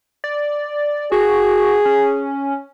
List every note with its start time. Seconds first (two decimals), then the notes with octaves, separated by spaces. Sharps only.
0.24 D5
1.12 F#4 G#4
1.85 C#4